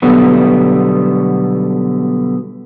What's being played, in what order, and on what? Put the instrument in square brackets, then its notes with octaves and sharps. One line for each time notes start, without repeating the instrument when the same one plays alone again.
[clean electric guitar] B2 D3 F#3 G3 A3 B3